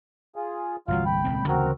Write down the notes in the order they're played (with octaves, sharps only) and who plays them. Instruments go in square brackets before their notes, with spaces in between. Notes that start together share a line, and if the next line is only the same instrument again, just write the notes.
[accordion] F4 G#4
[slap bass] G1 C2 E3 [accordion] F#3 F4 F5
[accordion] G5 B5
[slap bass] D#1 C#2 C4
[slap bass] D2 C#3 E3 [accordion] C4 F#4 A#4